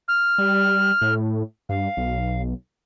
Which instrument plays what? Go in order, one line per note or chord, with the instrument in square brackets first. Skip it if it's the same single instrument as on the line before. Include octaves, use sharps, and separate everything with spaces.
[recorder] F6
[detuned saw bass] G3
A2
[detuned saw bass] G2 [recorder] F5
[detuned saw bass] B1